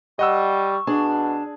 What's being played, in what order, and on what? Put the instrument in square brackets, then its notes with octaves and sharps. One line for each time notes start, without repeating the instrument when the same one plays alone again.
[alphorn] G3 [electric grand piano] D#5 F#5 E6 [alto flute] C#6
[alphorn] B2 [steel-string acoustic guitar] D4 [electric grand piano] G#4